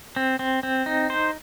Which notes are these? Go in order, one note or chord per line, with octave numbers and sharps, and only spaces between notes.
C4
C4
C4
D#4
C5